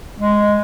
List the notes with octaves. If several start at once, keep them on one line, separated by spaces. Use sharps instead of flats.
G#3